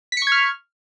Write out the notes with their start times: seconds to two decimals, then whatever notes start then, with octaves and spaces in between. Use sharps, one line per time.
0.12 B6
0.17 C#7
0.22 C#6
0.27 G#6
0.32 F6